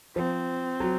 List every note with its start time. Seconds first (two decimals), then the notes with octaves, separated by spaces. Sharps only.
0.16 F3 C4
0.80 F#3